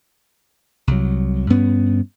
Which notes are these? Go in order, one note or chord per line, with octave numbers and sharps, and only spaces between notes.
C2 F#3
G2 B3 C#4